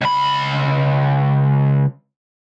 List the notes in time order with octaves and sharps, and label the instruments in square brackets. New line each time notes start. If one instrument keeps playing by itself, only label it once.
[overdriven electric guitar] C#2 B5